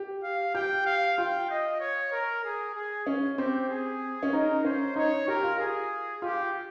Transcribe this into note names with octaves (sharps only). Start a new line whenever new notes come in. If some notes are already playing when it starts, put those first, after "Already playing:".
Already playing: G4
F5
G4 G5
F5
F4 G5
D#5
C#5
A#4
G#4
G#4
C#4
C4 G4
G#4
C#4
D#4 A#4
C#4 C5
D#4 C#5
G4 A#4
F4
G#4
F4 G4